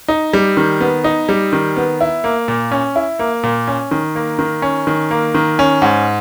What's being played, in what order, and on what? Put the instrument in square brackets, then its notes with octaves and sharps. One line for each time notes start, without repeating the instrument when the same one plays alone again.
[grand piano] D#4
G3
D#3
B3
D#4
G3
D#3
B3
E4
A#3
A#2
C#4
E4
A#3
A#2
C#4
D#3
A#3
D#3
C#4
D#3
A#3
D#3
C#4
G#2